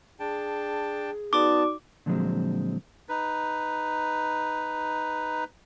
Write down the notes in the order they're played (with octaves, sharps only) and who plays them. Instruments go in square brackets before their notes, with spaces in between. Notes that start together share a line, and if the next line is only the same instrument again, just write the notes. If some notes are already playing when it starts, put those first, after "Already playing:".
[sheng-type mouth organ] D4 G5 A5 [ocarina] G#4
[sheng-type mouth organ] B3 A5 [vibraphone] D#4 F#4 D5 [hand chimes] D6
[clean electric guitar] A#2 D3 F3 F#3 G#3 C4
[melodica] D#4 B4